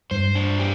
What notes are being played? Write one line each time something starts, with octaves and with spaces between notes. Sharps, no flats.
G2 C5
D4
G4